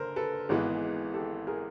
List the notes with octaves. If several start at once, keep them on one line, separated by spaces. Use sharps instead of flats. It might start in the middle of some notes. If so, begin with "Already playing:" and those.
Already playing: F#1 D3 A#4 C5
A4 B4
G#1 G#2 E3 G#3 B3
G4 A4
G#4 A#4